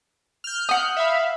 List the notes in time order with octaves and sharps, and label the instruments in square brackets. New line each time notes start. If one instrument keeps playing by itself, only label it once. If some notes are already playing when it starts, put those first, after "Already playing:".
[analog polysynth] F6 G6
[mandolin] F#5 D#6
[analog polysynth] E5 F5 B5